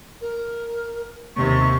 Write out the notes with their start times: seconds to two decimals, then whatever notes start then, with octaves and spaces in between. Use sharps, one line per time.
0.21 A#4
1.36 D#2 C3 C#6